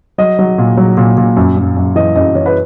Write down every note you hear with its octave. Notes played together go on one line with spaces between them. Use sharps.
F#3 D#5
F#3
A#2
F#3
A#2
A#2
F#2
F#2
F#2
E3 D#5
F#2 D#5
E3 C#5
B4